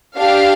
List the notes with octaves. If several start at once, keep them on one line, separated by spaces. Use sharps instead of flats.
D4 G4 F5